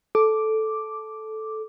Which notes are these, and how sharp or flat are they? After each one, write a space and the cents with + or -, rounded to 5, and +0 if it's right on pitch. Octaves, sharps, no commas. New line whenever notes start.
A4 -10 D6 +0